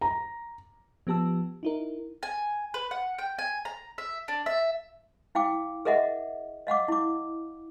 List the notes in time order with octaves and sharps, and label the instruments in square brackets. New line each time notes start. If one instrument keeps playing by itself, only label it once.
[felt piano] A#5
[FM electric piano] F3 B3 G4 A5 E6
D#4 E4 A#4
[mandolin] G#5
B4
F#5
G5
G#5
A#5
E5
D4
E5
[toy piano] E4 F5 G5 D6
G#4 A#4 D#5 E5 F#5
D#5 F5 F#5 D6
E4 D6